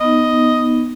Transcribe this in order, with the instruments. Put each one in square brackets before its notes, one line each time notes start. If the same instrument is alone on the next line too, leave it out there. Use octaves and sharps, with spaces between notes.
[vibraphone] B3 D#4 [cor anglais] D#5